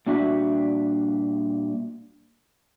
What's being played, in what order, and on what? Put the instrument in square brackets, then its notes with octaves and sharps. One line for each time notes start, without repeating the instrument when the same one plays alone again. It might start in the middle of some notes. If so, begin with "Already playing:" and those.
[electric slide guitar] A#2 G3 D4 F#4 D5 E5